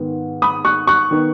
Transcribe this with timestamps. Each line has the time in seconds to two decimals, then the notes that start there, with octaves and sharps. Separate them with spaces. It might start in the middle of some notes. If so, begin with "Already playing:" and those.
Already playing: G#2 D#3 B3
0.42 B5 D#6
0.65 C#6 F#6
0.87 C#6 F#6
1.11 D#3 B3 D#4